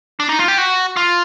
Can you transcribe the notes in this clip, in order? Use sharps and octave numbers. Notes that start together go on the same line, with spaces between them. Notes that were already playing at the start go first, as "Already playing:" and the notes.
D4
D#4
F4
G4
F#4
F4